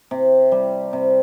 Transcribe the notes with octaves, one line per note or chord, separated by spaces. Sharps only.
C3
G3
C3